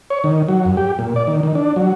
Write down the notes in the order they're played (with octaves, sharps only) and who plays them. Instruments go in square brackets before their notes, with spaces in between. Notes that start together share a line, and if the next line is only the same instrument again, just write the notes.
[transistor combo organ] C#5
D#3
F#3
F#2
G4
A#2
D5
D#3
D#3
D4
F#3